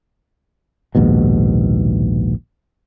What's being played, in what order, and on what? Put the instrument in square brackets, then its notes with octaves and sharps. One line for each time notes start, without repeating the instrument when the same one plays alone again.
[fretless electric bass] A#1 D#2 G#2 B2